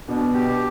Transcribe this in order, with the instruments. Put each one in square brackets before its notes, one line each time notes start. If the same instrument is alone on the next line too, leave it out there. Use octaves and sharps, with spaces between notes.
[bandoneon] B2 [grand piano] B3 D4
[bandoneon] G4